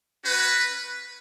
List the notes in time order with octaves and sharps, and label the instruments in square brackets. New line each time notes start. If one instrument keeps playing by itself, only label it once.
[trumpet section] C#4 F#4 B4